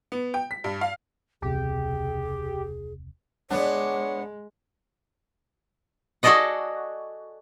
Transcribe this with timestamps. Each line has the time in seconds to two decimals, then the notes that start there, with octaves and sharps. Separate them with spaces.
0.12 B3
0.34 G5
0.51 B6
0.64 G2
0.81 F5
1.42 E1 C#2 C3 G4 G#4
3.50 G#3 B3 D4 C#5 F#5
6.23 F#4 G#4 A4 D5 D#5 F#5